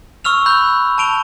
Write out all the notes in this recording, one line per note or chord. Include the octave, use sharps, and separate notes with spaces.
C#6 E6 F6 F7
B5 F#6 G6
A5 C#6 D7 F7 G7